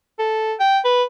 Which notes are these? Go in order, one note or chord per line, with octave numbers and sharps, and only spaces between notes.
A4
G5
B4